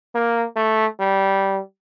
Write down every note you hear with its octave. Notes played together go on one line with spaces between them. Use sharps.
A#3
A3
G3